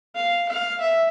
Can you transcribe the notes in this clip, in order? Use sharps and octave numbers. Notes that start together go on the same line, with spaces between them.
F5
F5
E5